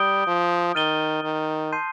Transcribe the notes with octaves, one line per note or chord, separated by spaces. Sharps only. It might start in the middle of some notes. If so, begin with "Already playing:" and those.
Already playing: G3 D#6 G6 D7 G7
F3
D#3 F6 A6 D#7 G7
D#3
A5 C6 G6 C7 D#7